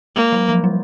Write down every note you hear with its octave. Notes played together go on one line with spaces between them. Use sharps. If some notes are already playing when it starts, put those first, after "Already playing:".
G#3 A#3
F#3
F3
G3